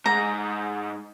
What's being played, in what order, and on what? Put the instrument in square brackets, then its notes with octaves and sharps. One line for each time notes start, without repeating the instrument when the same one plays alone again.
[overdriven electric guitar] G#2 [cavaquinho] A#5